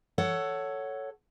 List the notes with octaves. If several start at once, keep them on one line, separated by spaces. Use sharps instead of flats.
A4 C#5 F#5